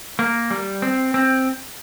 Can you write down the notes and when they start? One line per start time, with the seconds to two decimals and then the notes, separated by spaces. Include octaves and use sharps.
0.19 A#3
0.51 G3
0.82 C4
1.14 C4